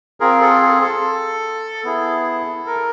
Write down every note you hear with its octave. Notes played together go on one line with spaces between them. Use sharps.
C4 F4 G#4 A#4
A4
G#4
A4
B3 E4 G#4
A#4